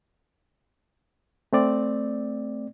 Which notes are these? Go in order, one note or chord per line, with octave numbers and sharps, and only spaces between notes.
A3 C4 D5